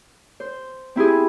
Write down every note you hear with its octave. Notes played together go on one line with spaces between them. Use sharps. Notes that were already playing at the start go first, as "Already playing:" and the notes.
C5
C4 E4 G4 G#4